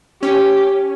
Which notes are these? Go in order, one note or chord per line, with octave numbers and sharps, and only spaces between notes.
C#4 G4